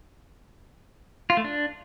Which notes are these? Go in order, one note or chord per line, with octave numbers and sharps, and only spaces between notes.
F4
A3
D4